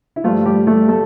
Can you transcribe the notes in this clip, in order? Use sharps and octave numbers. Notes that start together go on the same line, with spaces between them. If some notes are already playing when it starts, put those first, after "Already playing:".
E4
G2 F3 A3 F4
G3 G4
A3 A4
A3 A4